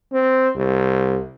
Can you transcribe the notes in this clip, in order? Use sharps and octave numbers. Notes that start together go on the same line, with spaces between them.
C4
C2